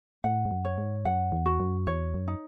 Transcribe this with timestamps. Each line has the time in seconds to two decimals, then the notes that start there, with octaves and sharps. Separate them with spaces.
0.24 A2 F#5
0.45 G#2
0.51 F#2
0.65 C#5
0.78 G#2
1.05 F#2 F#5
1.32 E2
1.46 F#4
1.60 F#2
1.87 E2 C#5
2.14 F#2
2.28 D#4